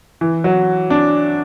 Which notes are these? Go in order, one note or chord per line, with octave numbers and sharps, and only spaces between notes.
E3
F#3
D4